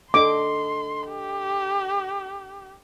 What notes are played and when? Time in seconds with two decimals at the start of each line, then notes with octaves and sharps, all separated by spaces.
0.14 D4 A4 D#5 C6 D6
1.09 G4